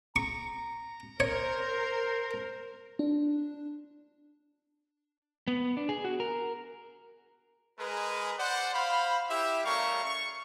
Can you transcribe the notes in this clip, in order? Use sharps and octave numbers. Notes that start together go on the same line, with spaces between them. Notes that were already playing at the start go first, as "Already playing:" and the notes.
A#5 C#6
A#4 C5 C#5
D4
B3
D4
G#4
F#4
A#4
G#3 G#4 A#4 B4
C5 D5 F#5
C5 F5 B5
E4 G4 E5
G3 A3 C#4 A#4 F5 C#6
C#6